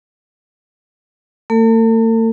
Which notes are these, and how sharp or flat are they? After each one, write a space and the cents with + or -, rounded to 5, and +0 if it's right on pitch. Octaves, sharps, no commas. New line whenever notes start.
A3 +45 A4 +45